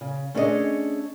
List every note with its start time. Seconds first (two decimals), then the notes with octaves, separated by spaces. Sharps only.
0.01 C#3
0.34 A3 C#4 D4 G#4 C#5 D#5